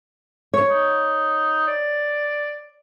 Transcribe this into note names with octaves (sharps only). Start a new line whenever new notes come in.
C#5
D#4
D5